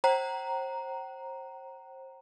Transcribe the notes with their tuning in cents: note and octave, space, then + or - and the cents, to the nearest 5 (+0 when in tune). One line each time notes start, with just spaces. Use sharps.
C5 +30 G5 -45 A#5 +0